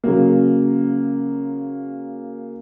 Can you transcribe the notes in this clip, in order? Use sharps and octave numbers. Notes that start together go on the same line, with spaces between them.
C#3 F#3 A#3